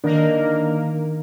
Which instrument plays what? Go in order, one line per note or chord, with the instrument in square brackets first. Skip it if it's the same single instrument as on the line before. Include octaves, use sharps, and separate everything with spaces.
[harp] D#3 [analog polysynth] A#3 A#4 [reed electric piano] D4